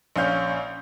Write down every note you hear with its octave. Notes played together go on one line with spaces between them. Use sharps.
A#1 C#4 F5 G6